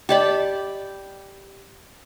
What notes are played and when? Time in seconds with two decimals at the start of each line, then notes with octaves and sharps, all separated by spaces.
0.09 G4 D5 D#5 G5 A5 B5